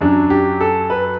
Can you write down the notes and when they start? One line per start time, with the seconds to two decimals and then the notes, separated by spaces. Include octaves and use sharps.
0.01 F#2 F#3 D4
0.30 G4
0.61 A4
0.90 B4